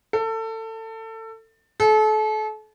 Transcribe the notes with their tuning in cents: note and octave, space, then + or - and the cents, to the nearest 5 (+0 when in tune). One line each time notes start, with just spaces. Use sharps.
A4 +25
A4 -35